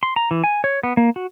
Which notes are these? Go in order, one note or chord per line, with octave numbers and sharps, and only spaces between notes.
C6
A#5
E3
G#5
C#5
B3
A#3
F#4